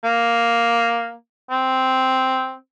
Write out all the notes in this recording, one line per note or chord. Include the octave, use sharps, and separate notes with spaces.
A#3
C4